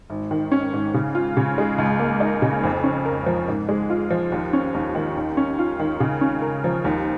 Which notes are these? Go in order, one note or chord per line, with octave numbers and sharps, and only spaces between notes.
G#1
D#3
C#4
G#2
C#3
F4
C#3
G#3
C#2
A#3
D#4
C#3
F2
C#4
A#4
F3
G#2
G#3
F4
F3
D#2
C#4
D#2
D#3
D#2
C#4
F4
D#3
C#3
C#4
A#4
F3
D#2